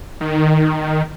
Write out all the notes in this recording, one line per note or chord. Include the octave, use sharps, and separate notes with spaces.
D#3